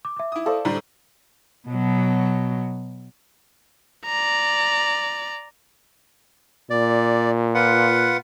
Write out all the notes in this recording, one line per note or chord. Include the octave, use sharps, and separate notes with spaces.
D6
E5 D6
E4 D#6
A4 C5 D5 F5
A2 D3 G3 A#5
B2 F#3
D5 A#5
A#2 D5
F4 B4 F#5